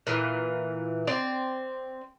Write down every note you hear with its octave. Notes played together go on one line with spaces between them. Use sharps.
A#2 E3
C4 D5